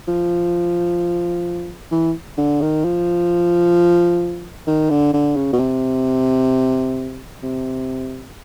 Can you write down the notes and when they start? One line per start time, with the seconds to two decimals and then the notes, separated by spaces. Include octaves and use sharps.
0.08 F3
1.92 E3
2.38 D3
2.62 D#3
2.85 F3
4.67 D#3
4.90 D3
5.14 D3
5.36 C#3
5.53 B2
5.60 C3
7.43 C3